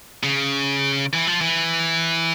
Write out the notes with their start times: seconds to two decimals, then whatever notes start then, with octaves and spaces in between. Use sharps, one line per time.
0.23 C#3
1.13 E3
1.27 F3
1.41 E3